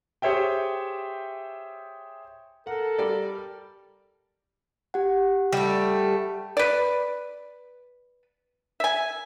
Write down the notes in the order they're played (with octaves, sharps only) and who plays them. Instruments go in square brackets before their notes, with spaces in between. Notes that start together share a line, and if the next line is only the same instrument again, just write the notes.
[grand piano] G4 G#4 C5 C#5 E5 G5
[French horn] A4 [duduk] A#4 [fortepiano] F#5
[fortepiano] G3 D5
[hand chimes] G4 F#5
[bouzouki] G3 A3
[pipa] B4 D5
E5 G#5